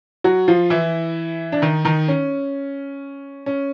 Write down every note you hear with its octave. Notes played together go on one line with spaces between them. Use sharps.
F#3 F#4
F3 F4
E3 E4
D4
D#3 D#4
D#3 D#4
C#4
C#4